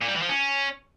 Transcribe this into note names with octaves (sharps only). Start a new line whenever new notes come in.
A#2
G3
E3
F3
C#4